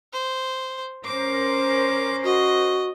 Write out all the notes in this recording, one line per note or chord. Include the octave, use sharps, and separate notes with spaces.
C5
C#4 A#4 C5 D6
F#4 D#5